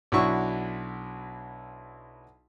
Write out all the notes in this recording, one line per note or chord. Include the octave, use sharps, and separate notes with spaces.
B1 D4 E4 F#4 C#6 E6